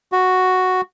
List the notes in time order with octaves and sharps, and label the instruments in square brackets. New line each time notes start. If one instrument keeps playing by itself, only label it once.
[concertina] F#4